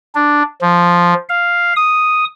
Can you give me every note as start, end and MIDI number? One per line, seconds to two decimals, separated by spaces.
0.15 0.43 62
0.61 1.14 53
1.29 1.73 77
1.76 2.25 87